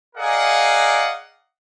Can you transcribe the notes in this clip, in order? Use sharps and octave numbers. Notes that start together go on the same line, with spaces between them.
G#4 A#4 D5 D#5 F5 F#5